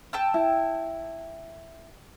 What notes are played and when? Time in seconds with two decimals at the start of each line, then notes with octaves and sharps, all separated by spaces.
0.13 G5 A5 E6
0.34 E4